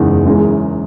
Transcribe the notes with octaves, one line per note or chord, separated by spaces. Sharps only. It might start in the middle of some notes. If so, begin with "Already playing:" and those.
Already playing: F#1 E2 C#3 G#3 D#4
F#2 E3 G#3